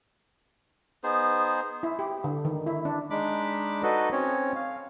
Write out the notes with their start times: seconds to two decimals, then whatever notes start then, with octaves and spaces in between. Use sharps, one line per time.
1.04 B3 D#4 G#4 C5
1.83 E4
1.99 G4
2.24 D3
2.45 D#3
2.67 E4
2.85 D4
3.10 G#3 D4 D#4 B5 D6
3.83 D#4 F#4 A4 B4 D#5
4.12 C4 C#4 C#5
4.56 F5